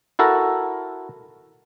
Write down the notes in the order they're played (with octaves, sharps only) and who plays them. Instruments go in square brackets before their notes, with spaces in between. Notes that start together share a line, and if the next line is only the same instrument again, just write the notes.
[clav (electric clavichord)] E4 F#4 A4 A#4